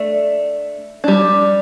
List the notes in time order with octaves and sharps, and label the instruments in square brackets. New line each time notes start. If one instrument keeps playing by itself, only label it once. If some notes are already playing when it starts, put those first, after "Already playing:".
Already playing: [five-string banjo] A3 D4
G3 D4